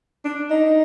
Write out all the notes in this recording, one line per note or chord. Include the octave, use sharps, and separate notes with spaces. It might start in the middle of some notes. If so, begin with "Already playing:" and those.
D4
D#4